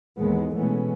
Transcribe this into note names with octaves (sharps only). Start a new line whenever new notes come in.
D#2 G#2 E3 G#3 B3
B2 E3 G#3 A3 B3 C#4